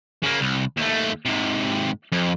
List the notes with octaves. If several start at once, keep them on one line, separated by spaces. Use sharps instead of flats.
C#3 A#3
C2
D#2 A3
G#2 C3
F2